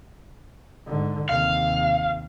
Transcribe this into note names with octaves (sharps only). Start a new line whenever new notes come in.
G#2 D3
D#2 C3 F5